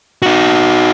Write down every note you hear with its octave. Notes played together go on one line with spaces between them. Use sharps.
D#4 F#4